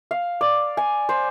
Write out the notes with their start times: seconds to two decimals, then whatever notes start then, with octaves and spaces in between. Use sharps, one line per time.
0.11 F5
0.41 D5
0.77 G#5
1.09 C5